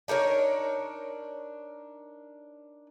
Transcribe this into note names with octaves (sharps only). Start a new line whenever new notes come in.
D4 D#4 A#4 C#5